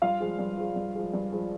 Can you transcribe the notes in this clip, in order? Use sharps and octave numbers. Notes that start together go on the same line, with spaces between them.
G2 F4 F5
F3 G#3
G2
F3 G#3
G2
F3 G#3
G2
F3 G#3